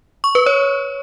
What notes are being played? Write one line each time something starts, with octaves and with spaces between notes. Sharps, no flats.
C#6
B4
C#5